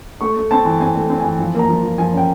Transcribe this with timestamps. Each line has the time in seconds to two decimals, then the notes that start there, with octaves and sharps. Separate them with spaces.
0.21 A3 C#6
0.37 A3
0.51 C4 A5
0.65 E3
0.80 C4 G#5
0.96 A3
1.10 C4
1.20 E3 G#5
1.39 F3
1.54 A#3 A#5
1.69 F3
1.83 F3
1.98 F3 G#5
2.13 C#4 G5